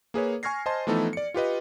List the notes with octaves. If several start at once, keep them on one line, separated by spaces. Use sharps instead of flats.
A#3 G#4 B4 C#5
G#5 C#6 F6 G#6 A#6 C7
C5 D#5 G#5 A5 C6
E3 F3 A3 B3 D#4 A4
D5 C#7
F4 G4 B4 D#5